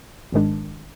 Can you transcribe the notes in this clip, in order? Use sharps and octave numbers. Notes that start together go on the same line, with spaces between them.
G#1 G#2 D#3 G#3 D4